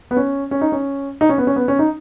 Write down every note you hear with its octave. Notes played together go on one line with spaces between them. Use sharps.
B3
C#4
C#4
D#4
C#4
D#4
C#4
B3
C#4
B3
C#4
D#4